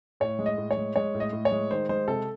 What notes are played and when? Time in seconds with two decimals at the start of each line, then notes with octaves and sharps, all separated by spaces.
0.20 A2 C#5
0.39 G#3
0.46 D#5
0.58 A2
0.71 C#5
0.77 G#3
0.96 G#3 C#5
1.14 A2
1.20 D#5
1.33 A2
1.45 C#5
1.52 G#3
1.71 D#3 C5
1.89 G#3 C5
2.08 C3 A4